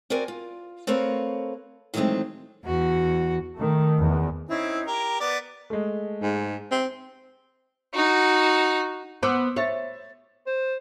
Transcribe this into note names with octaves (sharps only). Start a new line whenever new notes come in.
C4 F#4 A#4 D5 G#5
F4
A3 C4 A#4 B4 C#5 F5
D#3 E3 F#3 G#3 A3 C4
E2 F#4
D#3 A3
E2
C4 C#4 D#4 E4
G4 A#4 A#5
B3 D5
G#3 A3
G#2
C4
D#4 F#4
B3 C5 D6 E6
C5 C#5 E5 A6
C5